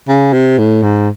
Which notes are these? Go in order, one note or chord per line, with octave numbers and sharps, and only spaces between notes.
C#3
C3
A2
G#2